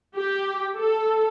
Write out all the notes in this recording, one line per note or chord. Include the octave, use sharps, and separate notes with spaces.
G4
A4